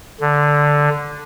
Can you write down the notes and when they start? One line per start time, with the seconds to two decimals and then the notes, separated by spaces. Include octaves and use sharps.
0.21 D3